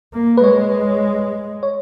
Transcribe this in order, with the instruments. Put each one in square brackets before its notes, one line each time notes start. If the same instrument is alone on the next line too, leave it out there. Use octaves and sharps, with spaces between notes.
[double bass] A#3
[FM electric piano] B4
[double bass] G#3 [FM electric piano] C#5
[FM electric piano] C#5